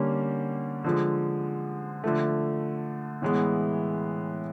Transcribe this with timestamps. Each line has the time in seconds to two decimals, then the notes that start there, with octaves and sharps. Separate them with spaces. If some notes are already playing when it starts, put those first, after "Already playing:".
Already playing: D3 G3 A#3 C#4
0.84 D3 F3 G#3
2.04 D3 F3 A3
3.22 A2 E3 G#3 B3